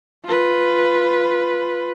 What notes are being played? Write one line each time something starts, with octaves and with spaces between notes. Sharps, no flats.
F4 B4